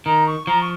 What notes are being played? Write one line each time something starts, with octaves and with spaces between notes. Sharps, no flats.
D#3 A#5
C#6
F3 A#5
C#6